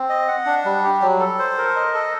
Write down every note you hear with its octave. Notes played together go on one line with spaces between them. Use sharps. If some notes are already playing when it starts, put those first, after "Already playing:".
Already playing: C4
D#5
F#5
D4
G3
G4
F#3
A4
C5
A#4
D#5
A4